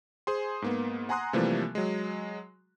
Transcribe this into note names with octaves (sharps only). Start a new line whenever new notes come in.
G#4 C5 G#5 C6
G#2 A#3 B3
F#5 G#5 A#5 C6 D#6 F#6
C3 E3 F3 G3 A3 A#3
F#3 G#3